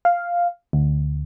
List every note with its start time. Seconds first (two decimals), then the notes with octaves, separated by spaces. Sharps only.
0.05 F5
0.73 D2